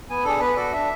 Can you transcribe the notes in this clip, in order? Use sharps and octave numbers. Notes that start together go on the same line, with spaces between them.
B3 G#5
D4 G#4 A4
B3 B4
F#4 A4 D5
D4 E5